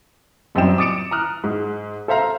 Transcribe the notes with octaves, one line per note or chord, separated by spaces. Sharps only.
F#1 F#2 G3 C4 G5 E7
D6 D#6 A6 C#7 D7 E7
A#5 D#6 F6 F#6
G#2
A4 C5 E5 F5 A#5